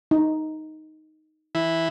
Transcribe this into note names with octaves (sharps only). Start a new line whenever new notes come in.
D#4
E3 E4